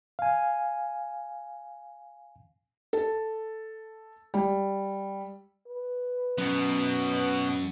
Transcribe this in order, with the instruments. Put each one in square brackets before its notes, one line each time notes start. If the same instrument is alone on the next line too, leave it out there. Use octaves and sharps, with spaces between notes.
[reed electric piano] F5 G#5
[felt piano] A4
G3
[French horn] B4
[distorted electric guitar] F#2 [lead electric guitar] B2 B3